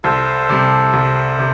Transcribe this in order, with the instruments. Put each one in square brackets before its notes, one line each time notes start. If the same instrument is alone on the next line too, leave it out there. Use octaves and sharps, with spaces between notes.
[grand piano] C2 [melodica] A4 C5
[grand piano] C3 G3
C2
C3